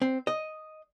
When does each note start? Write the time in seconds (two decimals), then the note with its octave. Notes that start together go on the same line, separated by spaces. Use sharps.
0.02 C4
0.27 D#5